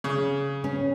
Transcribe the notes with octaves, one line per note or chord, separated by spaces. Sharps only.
C#3
C#4